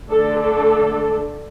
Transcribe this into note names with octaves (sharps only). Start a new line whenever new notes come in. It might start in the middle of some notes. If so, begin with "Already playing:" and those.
D3 A3 D4 A4
A4